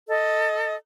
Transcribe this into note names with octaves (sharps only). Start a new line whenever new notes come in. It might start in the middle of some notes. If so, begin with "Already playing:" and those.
A4 D#5